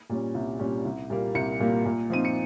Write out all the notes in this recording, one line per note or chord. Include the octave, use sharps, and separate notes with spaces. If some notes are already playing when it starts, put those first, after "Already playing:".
A#2 G3 C#4
C2
A#2 G3 C#4
C2
A#2 G3 A#3
C2 C#7
A#2 G3 A#3
A#2
F3 C4 D#4 D#7
C#7